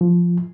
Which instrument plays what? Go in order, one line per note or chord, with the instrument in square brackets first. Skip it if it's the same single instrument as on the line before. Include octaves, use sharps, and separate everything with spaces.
[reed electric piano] F3